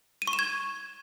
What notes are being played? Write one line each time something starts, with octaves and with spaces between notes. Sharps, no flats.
D#7
C#6
E7
G#6